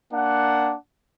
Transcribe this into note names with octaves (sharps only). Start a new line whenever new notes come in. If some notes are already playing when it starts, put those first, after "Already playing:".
A#3 D4 F#5